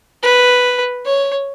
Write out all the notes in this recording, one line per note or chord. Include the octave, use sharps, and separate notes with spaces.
B4
C#5